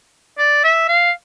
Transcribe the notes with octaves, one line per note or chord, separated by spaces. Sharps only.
D5
E5
F5